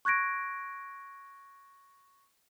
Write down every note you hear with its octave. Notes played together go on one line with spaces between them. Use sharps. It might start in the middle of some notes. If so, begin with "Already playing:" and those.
C#6 F#6 G#6 A#6 D7